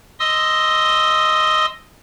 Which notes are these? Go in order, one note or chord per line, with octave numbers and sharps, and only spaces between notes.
D#5 C6 D#6 E6